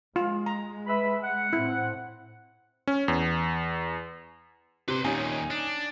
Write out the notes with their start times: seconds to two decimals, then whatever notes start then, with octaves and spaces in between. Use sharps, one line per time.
0.16 G#3 F4
0.46 A#5
0.87 B4 E5 B5
1.23 F#5
1.53 A2 C4 E4
2.87 C#4
3.08 E2
4.88 C3 B4 C6
5.04 D#2 A#2 C#4 D#4 G#5
5.51 D4